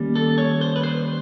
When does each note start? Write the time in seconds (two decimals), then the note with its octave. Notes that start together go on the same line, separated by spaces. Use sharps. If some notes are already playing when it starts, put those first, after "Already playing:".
Already playing: D#3 G3 A#3 C#4
0.16 A4
0.38 C#5
0.61 C5
0.76 B4
0.83 C5